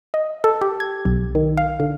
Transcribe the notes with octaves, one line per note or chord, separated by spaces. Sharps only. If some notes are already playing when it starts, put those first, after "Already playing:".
D#5
A4
G4
G#6
B1
D#3
F5
D3